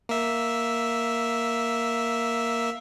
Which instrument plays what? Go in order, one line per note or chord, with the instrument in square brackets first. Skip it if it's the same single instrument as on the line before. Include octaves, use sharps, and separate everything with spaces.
[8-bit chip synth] A#3 E5